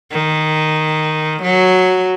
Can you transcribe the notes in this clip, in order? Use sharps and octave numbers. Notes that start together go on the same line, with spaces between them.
D#3
F#3